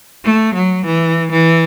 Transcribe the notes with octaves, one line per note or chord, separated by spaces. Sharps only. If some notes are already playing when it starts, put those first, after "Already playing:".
A3
F#3
E3
E3